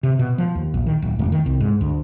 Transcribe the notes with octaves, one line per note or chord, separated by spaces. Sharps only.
C3
B2
F3
D#2
A#1
D#3
D1
F1
D#3
C2
G#2
D2